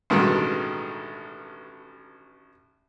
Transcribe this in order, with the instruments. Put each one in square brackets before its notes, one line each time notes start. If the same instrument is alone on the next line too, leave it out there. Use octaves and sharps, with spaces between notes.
[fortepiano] A1 G2 B2 D#3 G#3 A3